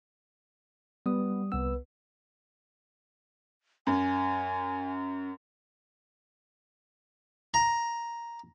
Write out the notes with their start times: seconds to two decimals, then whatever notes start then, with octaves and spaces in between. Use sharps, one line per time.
1.06 G3 B3 D#6
1.52 C2 B3 E6
3.87 F#2 G#5
7.54 A#5